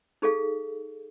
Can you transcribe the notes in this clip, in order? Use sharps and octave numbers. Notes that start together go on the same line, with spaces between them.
D#4 G#4 A4 F5